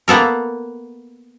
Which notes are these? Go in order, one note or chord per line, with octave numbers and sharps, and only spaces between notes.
A#3 B3 A4 A#4